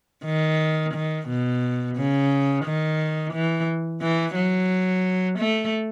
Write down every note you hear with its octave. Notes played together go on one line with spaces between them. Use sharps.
D#3
D#3
B2
C#3
D#3
E3
E3
F#3
A3